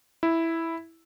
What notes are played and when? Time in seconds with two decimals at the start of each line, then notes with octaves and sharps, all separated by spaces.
0.23 E4